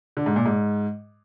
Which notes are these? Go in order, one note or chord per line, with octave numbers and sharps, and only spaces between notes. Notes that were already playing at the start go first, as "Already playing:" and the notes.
D3
G#2
A#2
G#2